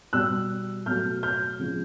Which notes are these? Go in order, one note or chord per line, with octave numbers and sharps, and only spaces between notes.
B2 G3 E6 F#6
B2 F#3 A3 F6 G6
F6 G6
C#3 F3 G#3